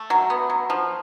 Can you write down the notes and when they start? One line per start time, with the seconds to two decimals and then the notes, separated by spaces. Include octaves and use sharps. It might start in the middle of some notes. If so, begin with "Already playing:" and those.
Already playing: A3
0.10 F#3
0.30 B3
0.50 F#3
0.70 F3